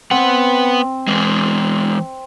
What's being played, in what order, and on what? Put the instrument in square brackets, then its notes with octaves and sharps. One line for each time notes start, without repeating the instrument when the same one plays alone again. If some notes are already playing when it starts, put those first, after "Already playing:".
[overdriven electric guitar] B3 F#5 [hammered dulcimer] C4
[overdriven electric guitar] E3 G#3